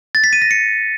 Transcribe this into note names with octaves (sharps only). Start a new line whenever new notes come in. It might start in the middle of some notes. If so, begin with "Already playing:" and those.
A6
B6
D#7
A#6
C#7